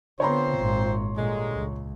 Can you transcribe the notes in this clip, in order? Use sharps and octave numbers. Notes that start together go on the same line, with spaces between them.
D3 B3 C4 F4 C5 C#5 A#5 C6
G#1 A#2
G2 A#2 D3 G#3
C#2